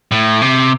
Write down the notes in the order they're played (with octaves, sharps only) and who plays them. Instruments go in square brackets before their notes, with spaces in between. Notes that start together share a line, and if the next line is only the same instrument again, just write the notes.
[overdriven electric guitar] A2
C3